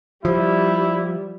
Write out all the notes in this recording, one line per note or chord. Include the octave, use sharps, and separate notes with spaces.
F3 G3 E4